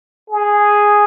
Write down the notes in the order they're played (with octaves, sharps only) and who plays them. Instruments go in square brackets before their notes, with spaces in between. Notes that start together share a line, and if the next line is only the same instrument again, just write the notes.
[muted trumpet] G#4